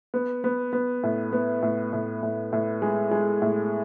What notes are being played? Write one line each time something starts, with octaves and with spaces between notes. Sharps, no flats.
B3
B3
B3
A2
B3
A2
A2
A2
A2
G#3
G#3
A2